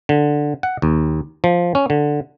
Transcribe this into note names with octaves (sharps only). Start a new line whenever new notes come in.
D3
F#5
D#2
F3
C#4
D3